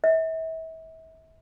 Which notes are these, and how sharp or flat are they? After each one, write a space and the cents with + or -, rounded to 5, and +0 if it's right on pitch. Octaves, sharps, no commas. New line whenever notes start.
E5 -35